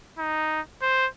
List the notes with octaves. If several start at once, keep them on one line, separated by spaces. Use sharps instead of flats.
D#4
C5